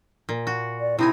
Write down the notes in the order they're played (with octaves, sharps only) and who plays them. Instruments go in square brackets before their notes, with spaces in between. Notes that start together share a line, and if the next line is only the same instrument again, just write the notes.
[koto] A#2
F#4
[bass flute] D5
[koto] C3 D#4 G#5 [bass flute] E4